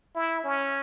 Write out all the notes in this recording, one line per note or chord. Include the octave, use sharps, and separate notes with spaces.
E4
C#4